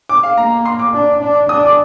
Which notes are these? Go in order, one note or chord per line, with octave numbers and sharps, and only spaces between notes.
D6
F5
A#3 A#5
C6
D6
D4
D4
D4 D#6
D6